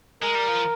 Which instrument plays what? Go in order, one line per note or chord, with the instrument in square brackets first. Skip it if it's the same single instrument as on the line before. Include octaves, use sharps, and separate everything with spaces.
[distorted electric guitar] G#3 [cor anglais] A#4
[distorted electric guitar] G3
F3